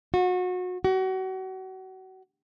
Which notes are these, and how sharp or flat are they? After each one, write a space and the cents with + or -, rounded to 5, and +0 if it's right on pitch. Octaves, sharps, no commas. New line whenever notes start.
F#4 -30
F#4 +30